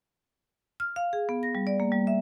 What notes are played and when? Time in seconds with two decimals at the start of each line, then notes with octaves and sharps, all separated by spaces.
0.80 F6
0.96 F5
1.13 G#4
1.29 B3
1.43 A#6
1.55 G3
1.67 D5
1.80 A#3
1.92 G3
2.07 E5